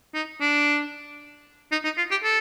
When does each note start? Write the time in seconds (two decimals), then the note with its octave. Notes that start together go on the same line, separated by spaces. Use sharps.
0.14 D#4
0.40 D4
1.72 D#4
1.84 D#4
1.97 F4
2.11 G4
2.24 A4